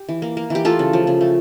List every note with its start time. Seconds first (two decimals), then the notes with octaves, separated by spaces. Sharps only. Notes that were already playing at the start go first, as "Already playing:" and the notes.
Already playing: G4
0.09 E3
0.22 A#3
0.37 A#3
0.50 E3 G4
0.65 A3 F4 A4
0.79 C#3
0.93 F3
1.07 C#3
1.21 A3